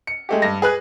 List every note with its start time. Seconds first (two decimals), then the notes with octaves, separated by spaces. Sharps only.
0.07 C#7
0.29 G#3 A3 G4
0.42 G2 A#6
0.62 G#4 B4 F#6